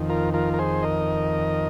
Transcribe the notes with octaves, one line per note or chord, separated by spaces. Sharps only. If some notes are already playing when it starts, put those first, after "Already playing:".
Already playing: F2 D#3
F4 A#4
F4 A#4
A#4
G#4 C5
A#4 D#5